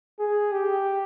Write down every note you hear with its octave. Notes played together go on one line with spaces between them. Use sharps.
G#4
G4